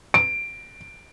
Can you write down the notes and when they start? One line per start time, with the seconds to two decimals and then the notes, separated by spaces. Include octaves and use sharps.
0.14 D7